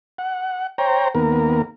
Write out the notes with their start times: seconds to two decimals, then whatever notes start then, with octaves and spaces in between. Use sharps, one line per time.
0.18 F#5
0.78 C5 C#5 G5 A#5
1.15 D#2 A#3 B3 A#4